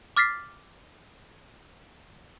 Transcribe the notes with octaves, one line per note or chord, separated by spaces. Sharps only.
D6 F6 A6 B6 C7